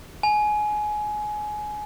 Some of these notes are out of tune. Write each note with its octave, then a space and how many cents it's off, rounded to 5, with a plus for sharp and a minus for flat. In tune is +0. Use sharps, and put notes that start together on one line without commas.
G#5 +20